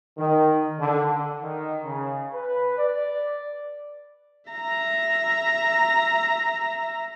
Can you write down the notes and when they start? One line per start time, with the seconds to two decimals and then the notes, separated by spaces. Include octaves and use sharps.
0.18 D#3
0.79 D3
1.42 D#3
1.84 C#3
2.34 B4
2.78 D5
4.51 E5 A#5